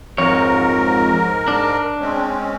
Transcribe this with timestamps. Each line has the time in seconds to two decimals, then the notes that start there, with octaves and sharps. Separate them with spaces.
0.18 F2 G#2 A#4 C#5
1.48 D4
2.00 G#3 C4 C#4